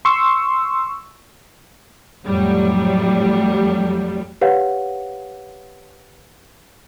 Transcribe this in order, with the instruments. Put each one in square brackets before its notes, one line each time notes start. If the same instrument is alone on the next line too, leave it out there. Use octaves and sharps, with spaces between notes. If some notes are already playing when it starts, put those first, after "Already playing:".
[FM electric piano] C6 C#6 E6
[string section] F2 A2 F#3 G3
[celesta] G4 B4 C#5 F5 F#5